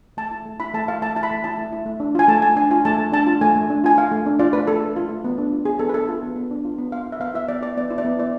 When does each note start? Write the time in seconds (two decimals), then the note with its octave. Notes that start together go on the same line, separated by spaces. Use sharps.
0.17 A3 A5
0.31 E4
0.46 A3
0.60 E4 B5
0.74 A3 A5
0.88 E4 F5
1.02 A3 A5
1.16 E4 A5
1.23 B5
1.31 A3
1.44 E4 A5
1.58 A3
1.73 E4
1.86 A3
2.00 D4
2.15 F4 G#5
2.28 A3 A5
2.42 A3 G#5
2.56 D4 G#5
2.71 F4 G#5
2.85 A3 A5
2.99 A3
3.12 D4 A5
3.26 F4
3.41 A3 G#5
3.56 A3
3.70 D4
3.84 F4 G#5
3.97 A3 F5
4.11 A3
4.26 D4
4.39 F4 D5
4.53 A3 B4
4.67 A3 A4
4.82 D4
4.96 F4
5.09 A3
5.24 B3
5.38 D4
5.52 F4
5.65 B3 G#4
5.80 B3 A4
5.89 B4
5.94 D4 A4
6.08 F4
6.23 B3
6.36 B3
6.51 D4
6.65 F4
6.79 B3
6.92 B3 F5
7.07 E4
7.12 E5
7.20 B3 F5
7.34 E4 E5
7.48 B3 D5
7.62 E4 D5
7.77 B3 D5
7.90 E4
7.98 D5
8.05 B3
8.19 E4 D5